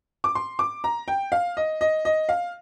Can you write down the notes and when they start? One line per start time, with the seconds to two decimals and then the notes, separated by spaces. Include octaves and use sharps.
0.24 D6
0.35 C6
0.59 D6
0.84 A#5
1.08 G5
1.32 F5
1.57 D#5
1.81 D#5
2.05 D#5
2.29 F5